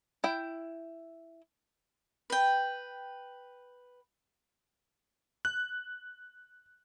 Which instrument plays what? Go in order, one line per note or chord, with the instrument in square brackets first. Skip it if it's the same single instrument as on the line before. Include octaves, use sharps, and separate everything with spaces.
[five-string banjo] E4 G5
[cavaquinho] B4 G5
[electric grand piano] F#6